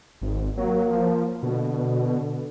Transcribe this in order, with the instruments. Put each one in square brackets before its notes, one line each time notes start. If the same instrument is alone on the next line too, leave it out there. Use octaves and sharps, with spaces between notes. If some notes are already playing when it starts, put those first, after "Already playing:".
[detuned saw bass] G#1
[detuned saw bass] F#3 [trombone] A#3
[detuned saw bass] F3
[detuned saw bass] B2 [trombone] D3